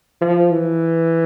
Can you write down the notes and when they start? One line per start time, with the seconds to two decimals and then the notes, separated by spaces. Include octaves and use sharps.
0.21 F3
0.51 E3